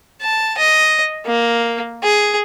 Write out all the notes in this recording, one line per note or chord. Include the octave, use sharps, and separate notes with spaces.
A5
D#5
A#3
G#4